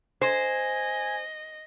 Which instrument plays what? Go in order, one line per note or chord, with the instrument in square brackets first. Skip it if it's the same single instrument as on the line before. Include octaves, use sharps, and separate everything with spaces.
[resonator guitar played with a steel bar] C5 [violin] D#5 [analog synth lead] G#5